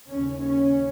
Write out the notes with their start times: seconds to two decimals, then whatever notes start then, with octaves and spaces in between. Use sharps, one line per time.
0.10 D#2 C#3 C#4
0.42 C#4